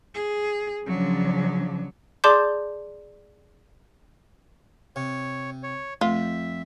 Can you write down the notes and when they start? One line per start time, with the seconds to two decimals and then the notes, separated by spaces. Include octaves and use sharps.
0.15 G#4
0.87 C#3 F3 F#3 D4
2.24 G#4 D5 A5 C6 D6 G6
4.96 C3 C#5
5.63 C#5
6.01 F2 A3 F4 E5